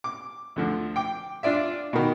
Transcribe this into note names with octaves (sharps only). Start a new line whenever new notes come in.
D6
D2 D3 F3
G5 D6
D4 F4 D5 E5
B2 D#3